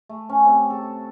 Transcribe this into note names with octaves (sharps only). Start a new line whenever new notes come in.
A3
C#4
C3
A4